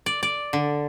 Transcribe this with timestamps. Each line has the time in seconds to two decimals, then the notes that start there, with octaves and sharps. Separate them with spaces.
0.06 D5
0.23 D5
0.53 D3